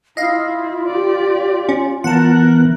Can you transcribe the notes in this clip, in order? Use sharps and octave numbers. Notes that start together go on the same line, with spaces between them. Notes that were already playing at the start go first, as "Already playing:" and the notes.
E4 F4 D#5 F5
G4 D5
C#4
E3 B3 A#4 F#5 A5 F#6